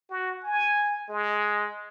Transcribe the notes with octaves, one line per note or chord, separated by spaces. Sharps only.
F#4
G#5
G#3